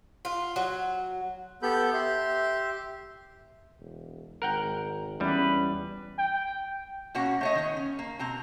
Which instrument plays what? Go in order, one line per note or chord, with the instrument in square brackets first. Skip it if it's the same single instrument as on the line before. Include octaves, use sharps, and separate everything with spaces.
[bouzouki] F4
F#3
[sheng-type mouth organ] B3 G4 A4 B5 G6
G4 E5 C6
[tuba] E1
[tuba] G#1 [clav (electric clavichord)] A#4 F#5 G5
[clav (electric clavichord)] E2 G3 [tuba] C#4 [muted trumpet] B4
[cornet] G5
[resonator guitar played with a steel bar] B2 A#3 C#4 F#4 F#5
A3 C#5 D#5
D#3 B3
C#4
A#3
B2 C4 A#5